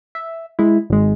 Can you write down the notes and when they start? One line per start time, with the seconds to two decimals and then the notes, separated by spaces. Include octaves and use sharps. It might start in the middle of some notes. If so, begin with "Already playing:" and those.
0.15 E5
0.59 G#3 E4
0.90 G#1 G#3